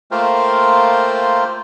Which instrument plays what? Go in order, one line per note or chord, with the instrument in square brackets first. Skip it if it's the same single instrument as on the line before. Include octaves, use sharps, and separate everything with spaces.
[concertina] A3 A#3 F4 A#4 C5 G5